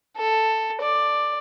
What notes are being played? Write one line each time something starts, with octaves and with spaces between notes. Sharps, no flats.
A4
D5